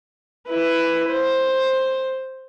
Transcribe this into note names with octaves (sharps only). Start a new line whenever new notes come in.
E4 B4
C5